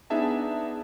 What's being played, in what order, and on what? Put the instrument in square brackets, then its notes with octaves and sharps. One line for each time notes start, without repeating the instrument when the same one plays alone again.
[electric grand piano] B3 D4 D#4 G#4 E5 A5